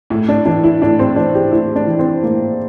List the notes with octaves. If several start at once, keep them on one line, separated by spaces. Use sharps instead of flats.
A2 E4
D4
E3 D4
E4
A2 D4
C4
E3 D4
G4
A2 E4
D4
E3
C4
A2 A#3